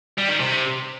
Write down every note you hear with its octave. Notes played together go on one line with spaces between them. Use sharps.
G3
D#3
C3